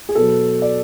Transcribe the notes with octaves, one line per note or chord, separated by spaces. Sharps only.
G#4
B2 F#3 A4
D5